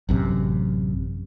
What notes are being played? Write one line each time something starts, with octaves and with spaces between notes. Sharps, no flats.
A1 F#2 C3